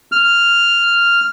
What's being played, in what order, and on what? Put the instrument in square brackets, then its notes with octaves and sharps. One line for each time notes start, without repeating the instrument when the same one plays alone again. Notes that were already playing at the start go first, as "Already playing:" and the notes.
[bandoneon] F6